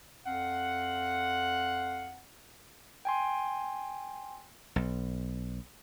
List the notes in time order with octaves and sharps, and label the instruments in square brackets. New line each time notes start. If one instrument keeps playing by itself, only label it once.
[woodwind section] F2 C4 F5 F#5
[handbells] G5 G#5 C6
[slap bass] B1